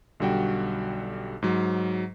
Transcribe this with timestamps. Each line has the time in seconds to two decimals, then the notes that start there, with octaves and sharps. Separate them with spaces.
0.20 B1 D3 G3 F#4 G5
1.42 G#2 F#3